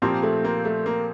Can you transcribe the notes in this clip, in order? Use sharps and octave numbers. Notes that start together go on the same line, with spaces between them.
A#2 F3 A#3 C4 G4
A3
A#3
A3
A#3